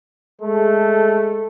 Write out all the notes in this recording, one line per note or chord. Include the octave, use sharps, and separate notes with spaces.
G#3 A3 A4